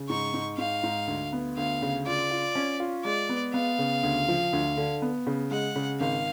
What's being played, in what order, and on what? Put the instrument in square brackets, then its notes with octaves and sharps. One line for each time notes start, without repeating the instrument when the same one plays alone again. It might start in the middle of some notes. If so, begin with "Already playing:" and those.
Already playing: [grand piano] C#3
[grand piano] G#2 [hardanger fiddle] C#6
[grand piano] G#2
[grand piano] G#2 [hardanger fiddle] F5
[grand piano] G#2
D2
B3
[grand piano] D2 [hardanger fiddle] F5
[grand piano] C#3
[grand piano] F4 [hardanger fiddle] D5
[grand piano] F4
C#4
F4
[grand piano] G#3 [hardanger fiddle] D5
[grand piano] B3
[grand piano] B3 [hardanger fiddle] F5
[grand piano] C#3
D2
F3
D2
D3
B3
C#3
[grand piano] G#3 [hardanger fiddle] F#5
[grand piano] C#3
[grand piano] G#1 [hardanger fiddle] F5